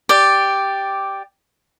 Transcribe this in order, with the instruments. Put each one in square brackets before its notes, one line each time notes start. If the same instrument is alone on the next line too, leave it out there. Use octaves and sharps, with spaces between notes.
[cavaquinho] G4 D5